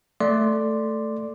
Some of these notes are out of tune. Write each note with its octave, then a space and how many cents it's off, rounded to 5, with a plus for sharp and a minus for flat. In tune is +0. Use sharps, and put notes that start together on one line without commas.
A3 +5 D5 +0 C6 +0